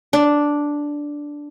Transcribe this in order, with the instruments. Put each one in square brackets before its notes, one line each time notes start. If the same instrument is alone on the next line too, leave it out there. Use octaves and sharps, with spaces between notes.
[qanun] D4